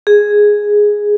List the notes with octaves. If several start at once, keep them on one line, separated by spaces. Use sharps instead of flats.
G#4